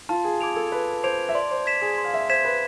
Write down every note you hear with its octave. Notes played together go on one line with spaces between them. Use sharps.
F4 A5
G#4
G#4 D6 G#6 D7 F7
A4
B4 A5
C5 D6 G#6 D7 F7
E5
D5 C6
C5
G#6 B6 E7
G#4
C6
F5
E5
C5 G#6 B6 E7
B4